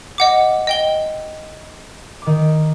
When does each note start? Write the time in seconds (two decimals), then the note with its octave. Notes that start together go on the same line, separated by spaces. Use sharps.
0.18 D#5 F#5 D6
0.67 D#5 G5 G7
2.22 D#3 D6